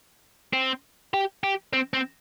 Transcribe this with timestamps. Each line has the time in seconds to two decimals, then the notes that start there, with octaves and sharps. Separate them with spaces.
0.53 C4
1.14 G4
1.44 G4
1.73 C4
1.93 C4